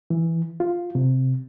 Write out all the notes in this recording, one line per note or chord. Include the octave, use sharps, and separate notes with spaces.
E3
F4
C3